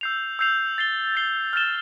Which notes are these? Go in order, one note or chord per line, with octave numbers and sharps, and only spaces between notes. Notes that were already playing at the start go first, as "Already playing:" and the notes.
E6 G6 C7 F7
E6 G6 C7 F7
A6 C7 G7
A6 C7 G7
F6 A6 E7 G7